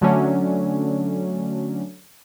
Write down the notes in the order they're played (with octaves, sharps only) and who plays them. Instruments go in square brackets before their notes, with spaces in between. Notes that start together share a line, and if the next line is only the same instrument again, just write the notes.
[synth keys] D3 F#3 A3 C#4 D4